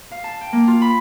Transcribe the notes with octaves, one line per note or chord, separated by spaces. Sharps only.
F5
A5
G5
A#3
F4
B5